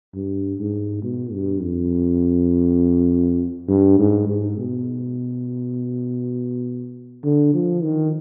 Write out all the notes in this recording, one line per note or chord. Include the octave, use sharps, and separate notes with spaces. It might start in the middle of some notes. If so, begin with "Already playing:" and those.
G2
G#2
B2
G2
F2
G2
G#2
G#2
B2
D3
F3
D#3